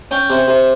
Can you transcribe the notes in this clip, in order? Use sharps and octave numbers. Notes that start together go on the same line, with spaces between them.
C#4 G5
C3
C3